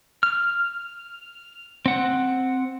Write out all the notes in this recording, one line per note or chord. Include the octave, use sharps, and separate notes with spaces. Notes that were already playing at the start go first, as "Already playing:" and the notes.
F6
C4 F#5